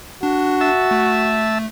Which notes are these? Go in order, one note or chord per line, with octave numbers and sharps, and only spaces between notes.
D4 F#4
E5 A5
A3